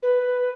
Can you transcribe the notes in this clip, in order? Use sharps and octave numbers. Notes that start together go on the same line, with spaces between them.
B4